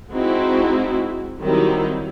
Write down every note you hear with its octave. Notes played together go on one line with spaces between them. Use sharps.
G#3 C4 D#4 E4 F#4
D#3 F#3 G3 C4 D#4 E4